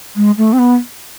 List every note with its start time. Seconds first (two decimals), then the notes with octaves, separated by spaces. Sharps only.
0.16 G#3
0.37 A3
0.53 C4
0.59 B3